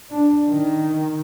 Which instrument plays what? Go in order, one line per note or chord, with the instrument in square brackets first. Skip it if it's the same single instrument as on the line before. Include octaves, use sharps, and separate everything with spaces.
[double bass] D4
D#3